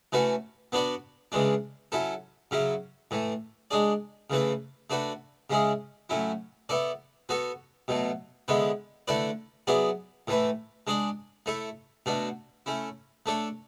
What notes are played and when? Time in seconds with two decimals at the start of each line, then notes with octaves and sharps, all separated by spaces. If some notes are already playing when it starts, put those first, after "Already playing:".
0.12 E3 A3 C#4 F#4 B4
0.72 B3 D4 F#4 B4 D5
1.32 C#3 E3 G#3 D4
1.92 F#3 C#4 E4 A4
2.51 C#3 F#3 C#4 E4
3.11 A2 E3 A3
3.71 G#3 D4 G#4 D5
4.30 C#3 E3 A3 E4 B4
4.90 A3 D4 F#4 B4
5.50 C#3 G#3 C#4 E4 G#4
6.10 A2 F#3 C#4 E4
6.69 B3 E4 A4 D5
7.29 B3 F#4 A4 C#5
7.88 B2 F#3 A3
8.48 D3 G#3 B3 E4 B4
9.08 D3 A3 E4 B4 D5
9.67 F#3 B3 E4 G#4 D5
10.27 A2 E3 A3 E4 B4
10.87 G#3 D4 G#4 D5
11.46 A3 E4 A4 C#5
12.06 B2 A3 D4 F#4
12.66 A3 C#4 E4
13.26 A3 D4 A4 C#5